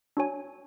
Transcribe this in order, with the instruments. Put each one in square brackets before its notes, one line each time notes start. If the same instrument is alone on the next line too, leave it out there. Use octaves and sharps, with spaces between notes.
[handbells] D4 F#4 C#5 G#5